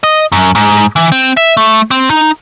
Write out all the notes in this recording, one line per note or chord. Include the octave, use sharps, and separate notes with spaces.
D#5
F#2
G#2
E3
C4
E5
A3
C4
D#4